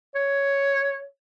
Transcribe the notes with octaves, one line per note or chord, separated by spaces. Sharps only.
C#5